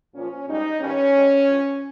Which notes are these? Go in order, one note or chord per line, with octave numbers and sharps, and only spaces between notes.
A#2 F3 C#4
G#2 G3 D#4
G2 D#3 G3 C#4
G#2 G3
G2 F3